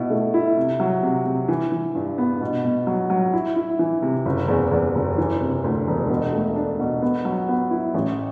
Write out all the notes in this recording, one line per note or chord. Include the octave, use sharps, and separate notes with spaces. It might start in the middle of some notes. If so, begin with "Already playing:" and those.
Already playing: B2 E4
A3
E4
C3
F#3
C3
C3
E3
E3
G2
B3
B2
B2
F#3
F#3
E4
E4
E3
C3
F#1
E2
E2
F#1
E3
C3
D2
E1
B2
A3
D4
B2
B3
F#3
B3
E4
A1